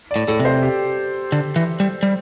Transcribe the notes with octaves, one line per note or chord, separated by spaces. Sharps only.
D5
A2
A2 A4
C3
C5
G4
D3
E3
G3
G3